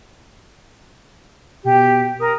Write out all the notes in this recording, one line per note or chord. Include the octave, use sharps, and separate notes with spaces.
B2 G4
A#4 D#6